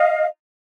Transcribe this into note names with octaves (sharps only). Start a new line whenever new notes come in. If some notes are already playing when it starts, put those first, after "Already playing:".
Already playing: D#5 F5